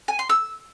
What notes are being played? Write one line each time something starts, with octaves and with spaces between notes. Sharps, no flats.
G#5
C6
E6